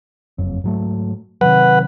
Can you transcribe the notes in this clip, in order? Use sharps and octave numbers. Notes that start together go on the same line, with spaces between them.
F#1 F2 F#3
G#2 F#3 A3
C3 D#3 F#3 B4 F#5